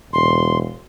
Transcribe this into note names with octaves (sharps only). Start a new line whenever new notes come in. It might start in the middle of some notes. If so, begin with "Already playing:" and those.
E1 C6